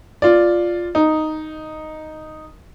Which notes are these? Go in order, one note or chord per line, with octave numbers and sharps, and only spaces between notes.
F4 D5
D#4